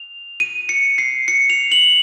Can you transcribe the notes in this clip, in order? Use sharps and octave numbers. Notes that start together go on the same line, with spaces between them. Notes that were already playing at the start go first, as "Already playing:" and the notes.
Already playing: F7
D#7
C#7
C7
C#7
F7
F#7